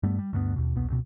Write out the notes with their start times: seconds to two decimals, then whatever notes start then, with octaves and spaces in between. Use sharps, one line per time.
0.03 G2 G3 A3 B3
0.19 G3
0.33 D2 G2 F#3 B3
0.56 D#2 B2
0.76 E1 C2 B2 B3
0.90 C#2 B2